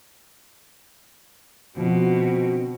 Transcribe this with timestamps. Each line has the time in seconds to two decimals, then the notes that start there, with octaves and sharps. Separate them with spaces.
1.76 B2 D3 F3 C4 F#4